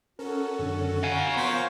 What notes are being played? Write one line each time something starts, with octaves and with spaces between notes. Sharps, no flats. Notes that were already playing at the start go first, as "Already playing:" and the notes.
C#4 F#4 A4 A#4
F#2 D3
F5 F#5 G#5
F3 B3 A#4 C5 C#5